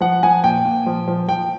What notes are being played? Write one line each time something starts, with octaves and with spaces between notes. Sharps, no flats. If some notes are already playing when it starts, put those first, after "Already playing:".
F3 F#5
F3 G#5
A#2 G5
A#2
F3
F3
F3 G5